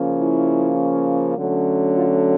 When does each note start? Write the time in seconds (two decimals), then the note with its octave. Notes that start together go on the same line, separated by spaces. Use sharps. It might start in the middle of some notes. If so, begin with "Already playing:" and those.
Already playing: C#3 F3 A#3 C#4
0.19 E4
1.37 D3 F#3 A3 C#4
1.95 F4